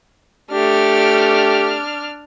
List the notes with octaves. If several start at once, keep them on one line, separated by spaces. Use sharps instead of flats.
A3 D4 G4 F6